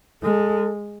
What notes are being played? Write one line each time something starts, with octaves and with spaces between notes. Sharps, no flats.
G#3 A4